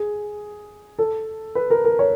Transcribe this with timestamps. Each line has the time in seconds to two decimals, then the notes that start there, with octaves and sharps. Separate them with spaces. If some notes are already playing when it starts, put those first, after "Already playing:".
Already playing: G#4
0.99 A4
1.55 B4
1.70 A#4
1.85 A#4
1.99 C#5